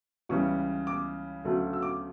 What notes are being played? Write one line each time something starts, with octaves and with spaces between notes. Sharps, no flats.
C#2 C#3 E3 G3 C#6
D6
D2 C#3 F#3 A3
E6
D6